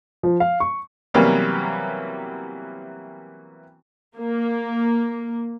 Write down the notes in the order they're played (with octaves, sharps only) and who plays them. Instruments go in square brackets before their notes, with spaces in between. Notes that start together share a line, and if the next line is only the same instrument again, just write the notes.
[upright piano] F3
F5
C#6
[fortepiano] C3 E3 F#3 G3 A#3 B3
[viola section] A#3